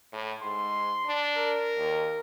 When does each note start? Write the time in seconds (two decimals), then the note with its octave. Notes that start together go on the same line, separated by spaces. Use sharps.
0.12 A2
0.42 G#2 C6
1.06 D4
1.36 A#4
1.77 D#2